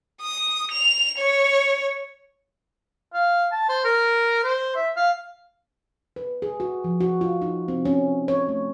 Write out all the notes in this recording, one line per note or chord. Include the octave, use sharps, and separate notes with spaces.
D#6
F7
C#5
F5
A5
C5
A#4
C5
E5
F5
B4
G#4
F#4
F3
F#4
F4
D#4
C4
C#4
C#5
A3